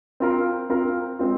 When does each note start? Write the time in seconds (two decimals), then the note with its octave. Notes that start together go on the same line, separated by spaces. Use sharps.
0.20 C4 F4 A#4
0.70 C4 F4 A#4
1.19 G#3 C4 F4